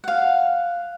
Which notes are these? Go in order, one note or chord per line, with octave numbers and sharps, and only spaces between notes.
F5 F#5